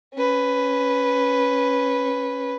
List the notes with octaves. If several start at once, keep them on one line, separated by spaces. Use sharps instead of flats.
C#4 B4